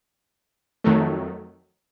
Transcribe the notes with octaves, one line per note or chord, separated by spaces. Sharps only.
F2 D#3 F#3 A3